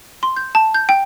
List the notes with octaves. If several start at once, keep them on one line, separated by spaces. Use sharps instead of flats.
C6
G6
A5
G6
G5